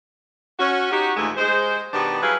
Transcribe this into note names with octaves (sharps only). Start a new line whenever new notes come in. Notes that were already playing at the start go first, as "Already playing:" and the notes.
C#4 F#4
D#4 F#4 G4
D#2 A#2 E3 G#3 A3
G#3 C5
B2 D#3 B3 D4 G4 B4
F#3 G3 E4 G#4 B4 F5